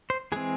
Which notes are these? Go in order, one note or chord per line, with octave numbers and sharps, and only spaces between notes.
C5
E3 G#3 C4 G#4